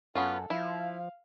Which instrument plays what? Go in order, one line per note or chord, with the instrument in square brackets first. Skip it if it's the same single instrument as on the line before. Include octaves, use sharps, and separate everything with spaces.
[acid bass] F#2 [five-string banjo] B3 C#4 F4 [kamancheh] A4 F#5
[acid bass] F3 [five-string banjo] E4 [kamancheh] F5